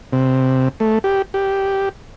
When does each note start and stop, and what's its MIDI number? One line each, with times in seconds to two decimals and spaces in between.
0.13 0.69 48
0.80 0.99 57
1.04 1.22 67
1.34 1.89 67